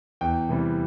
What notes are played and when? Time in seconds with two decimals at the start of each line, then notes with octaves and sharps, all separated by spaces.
0.21 E2 G5
0.49 C3 E3 G3